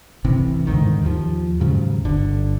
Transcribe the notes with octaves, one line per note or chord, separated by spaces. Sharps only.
A1 C3 E3
E2 G#2 D3 D#3
D#2 F3
D#2 G#2 C#3 F#3
G1 D3